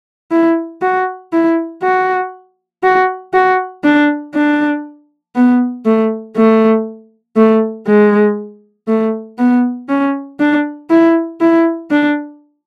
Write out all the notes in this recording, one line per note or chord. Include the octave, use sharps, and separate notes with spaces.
E4
F#4
E4
F#4
F#4
F#4
D4
D4
B3
A3
A3
A3
G#3
A3
B3
C#4
D4
E4
E4
D4